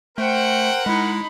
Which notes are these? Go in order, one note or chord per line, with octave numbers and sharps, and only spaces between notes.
A3 A#4 C5 F#5 G5
G#3 D#4 E4 B5